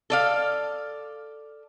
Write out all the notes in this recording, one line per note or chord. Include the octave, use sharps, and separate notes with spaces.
A4 D5 F5